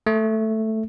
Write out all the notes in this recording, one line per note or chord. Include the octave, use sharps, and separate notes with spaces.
A3